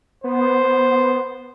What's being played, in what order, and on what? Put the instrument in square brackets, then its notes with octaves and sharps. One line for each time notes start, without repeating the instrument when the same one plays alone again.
[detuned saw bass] B3 [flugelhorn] C5